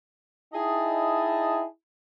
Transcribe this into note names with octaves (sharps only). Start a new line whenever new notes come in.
D#4 E4 G#4 D#5 G5 A5